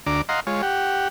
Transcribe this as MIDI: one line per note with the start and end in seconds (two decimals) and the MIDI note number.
0.07 0.22 38
0.07 0.22 62
0.07 0.22 82
0.07 0.22 86
0.29 0.40 75
0.29 0.40 77
0.29 0.40 78
0.29 0.40 82
0.29 0.40 84
0.47 0.62 56
0.47 0.62 65
0.47 0.62 73
0.63 1.08 67
0.63 1.08 78